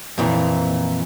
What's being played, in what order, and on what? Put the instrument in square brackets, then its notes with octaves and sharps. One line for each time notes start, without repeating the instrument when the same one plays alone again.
[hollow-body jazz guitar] F2 A#2 E3